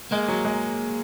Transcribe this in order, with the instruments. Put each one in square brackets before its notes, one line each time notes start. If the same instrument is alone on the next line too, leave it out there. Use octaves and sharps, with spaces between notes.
[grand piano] G#3 [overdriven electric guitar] A#3
[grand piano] F#3
G#3